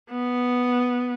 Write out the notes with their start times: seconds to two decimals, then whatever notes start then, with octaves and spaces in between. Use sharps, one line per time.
0.10 B3